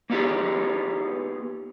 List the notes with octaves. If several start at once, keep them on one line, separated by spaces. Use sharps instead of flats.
A#3 B3 D#4 F4 G4 G#4